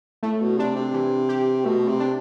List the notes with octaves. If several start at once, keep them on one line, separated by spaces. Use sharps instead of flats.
A2 A3
B2
C3 D4
C3
E3
G4
B2 A3
C3
D4